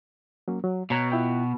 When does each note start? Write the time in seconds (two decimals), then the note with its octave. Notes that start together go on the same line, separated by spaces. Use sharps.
0.48 F#3 A#3 C#4
0.64 F#3
0.90 B2 C#5 A#5 G#6
1.12 E4 F4 G5